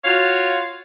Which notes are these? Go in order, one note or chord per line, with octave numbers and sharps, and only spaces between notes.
F4 F#4 C#5 F5